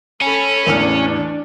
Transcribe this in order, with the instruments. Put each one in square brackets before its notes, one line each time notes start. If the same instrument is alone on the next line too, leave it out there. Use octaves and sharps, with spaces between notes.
[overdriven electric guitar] C#4 [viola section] A4 B5
[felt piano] A1 E2 F6 [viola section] D4